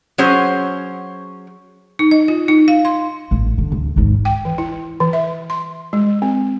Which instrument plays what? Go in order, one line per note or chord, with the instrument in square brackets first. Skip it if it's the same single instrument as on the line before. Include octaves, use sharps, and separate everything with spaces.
[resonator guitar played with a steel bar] F#3 C#4 G#4 C5
[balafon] D#4
D#5
F4
D#4
F5
C6
[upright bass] A1
D3
D2
G#1 D#2
[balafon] G5
E3
E4
E3
E5
C6
G#3
C4